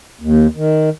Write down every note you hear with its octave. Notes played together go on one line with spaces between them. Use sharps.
D#2
D#3